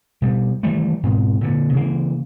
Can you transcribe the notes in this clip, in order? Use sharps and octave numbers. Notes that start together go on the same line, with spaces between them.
B2 G3
D#3 E3 G3 A3
G#2 B2 C4
A#2 D3
C#3 E3 A#3